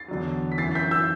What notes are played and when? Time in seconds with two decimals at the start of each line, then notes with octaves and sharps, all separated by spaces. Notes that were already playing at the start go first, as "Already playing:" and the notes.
Already playing: A6 C7
0.08 E2 D3 F#3
0.52 B6
0.58 F#2 E3 A6 C7
0.75 G6 B6
0.91 E6 G6